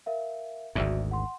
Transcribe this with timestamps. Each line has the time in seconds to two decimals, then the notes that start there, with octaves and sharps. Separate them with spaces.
0.06 A#4 E5 F5
0.75 G#1 D2 G#2 F#4 D5 E5
1.11 F#5 C6